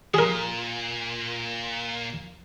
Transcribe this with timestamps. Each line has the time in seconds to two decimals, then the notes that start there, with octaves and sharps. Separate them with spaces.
0.14 A#2 G#4 A#4